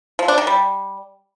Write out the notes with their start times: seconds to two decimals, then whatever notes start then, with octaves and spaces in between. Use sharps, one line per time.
0.19 F3
0.28 D4
0.38 D#3
0.47 G3